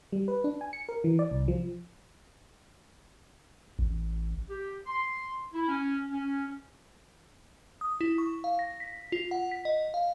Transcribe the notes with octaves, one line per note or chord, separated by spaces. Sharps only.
G3
B4
D4
G#5
C#7
A#4
E3
D5
C2
F3
A1
G4
C6
E4
C#4
C#4
D#6
E4
C#6
F5
A#6
B6
F4
F#5
B6
D#5
F5